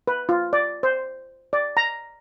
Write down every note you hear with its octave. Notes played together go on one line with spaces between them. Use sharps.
B4
F4
D5
C5
D5
A#5